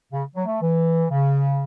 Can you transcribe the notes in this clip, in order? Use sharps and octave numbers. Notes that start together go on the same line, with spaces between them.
C#3
F#3
A3
E3
C#3